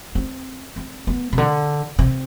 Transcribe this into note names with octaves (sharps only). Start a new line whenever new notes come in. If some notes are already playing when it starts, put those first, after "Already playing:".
C4
C4
B3
C3
D3
C3